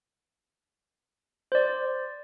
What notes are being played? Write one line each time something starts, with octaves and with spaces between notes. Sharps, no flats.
C5 D5